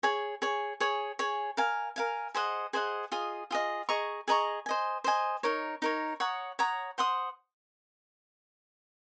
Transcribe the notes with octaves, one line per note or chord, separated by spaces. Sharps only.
G#4 C#5 G#5
G#4 C#5 G#5
G#4 C#5 G#5
G#4 C#5 G#5
A#4 F5 G#5
A#4 F5 G#5
G#4 C5 D#5 F#5
G#4 C5 D#5 F#5
F4 G#4 D#5
F4 G#4 D#5
G#4 D#5 A#5 C#6
G#4 D#5 A#5 C#6
C5 D#5 G#5
C5 D#5 G#5
D#4 A#4 C#5
D#4 A#4 C#5
C#5 F#5 A#5 D#6
C#5 F#5 A#5 D#6
C5 F#5 C6 D#6